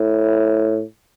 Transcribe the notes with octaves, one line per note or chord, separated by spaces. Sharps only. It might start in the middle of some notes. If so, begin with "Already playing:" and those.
Already playing: A2